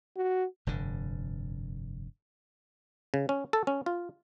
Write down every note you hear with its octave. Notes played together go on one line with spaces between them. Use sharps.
F#4
F1 G2 D3
C#3
C#4
A4
C#4
F4